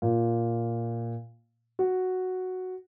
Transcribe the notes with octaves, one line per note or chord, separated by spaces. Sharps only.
A#2
F#4